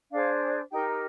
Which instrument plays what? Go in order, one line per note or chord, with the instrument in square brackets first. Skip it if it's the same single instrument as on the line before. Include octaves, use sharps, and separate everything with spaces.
[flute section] D4 G#4 C5 F5
D#4 G4 A#4 G5